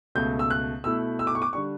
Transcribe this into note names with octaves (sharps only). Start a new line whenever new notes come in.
C#2 B2 A3 G6
E6
F#6
B2 A3 E4 E6
E6
D6
C#6
D6
D3 G3 D4 C#6